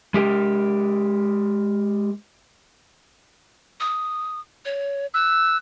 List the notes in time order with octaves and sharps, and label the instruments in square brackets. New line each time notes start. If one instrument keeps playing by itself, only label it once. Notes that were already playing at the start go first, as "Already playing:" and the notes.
[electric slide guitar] G#3 G4 A#4
[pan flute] D#6
C#5
[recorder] E6 [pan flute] F#6